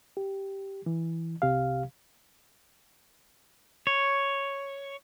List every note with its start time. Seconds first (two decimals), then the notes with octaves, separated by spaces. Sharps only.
0.17 G4
0.86 E3
1.42 C2 C3 G4 F5
3.87 C#5